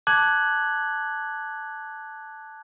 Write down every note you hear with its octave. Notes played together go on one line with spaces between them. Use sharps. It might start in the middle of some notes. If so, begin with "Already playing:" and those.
A5 D6 F#6 G#6 F#7